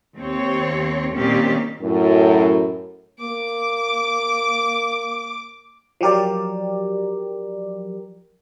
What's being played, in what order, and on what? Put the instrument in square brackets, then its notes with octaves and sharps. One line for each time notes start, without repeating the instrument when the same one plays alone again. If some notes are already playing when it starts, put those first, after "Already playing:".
[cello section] D#2 C4 C#5
A#2 D#3 G3 C4 C#4 G4
[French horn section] F#2 A2
[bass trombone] A#3 [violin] D6
[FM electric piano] F3 F#3 G4 A#4 D5